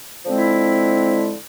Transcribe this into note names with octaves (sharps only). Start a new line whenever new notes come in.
D3 F3 G#3 C4 E4